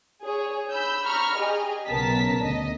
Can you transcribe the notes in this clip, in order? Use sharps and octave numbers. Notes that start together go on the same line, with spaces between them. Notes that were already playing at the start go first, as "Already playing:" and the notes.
G#4 C#5
B5 E6 G6
A#5 B5 C#6 F6
G4 G#4 D#5
B1 C#3 B3 A#4 A5 B6
D2 D#5